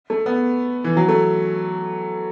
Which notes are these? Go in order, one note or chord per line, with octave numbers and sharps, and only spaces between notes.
A3
B3
E3
F#3
A3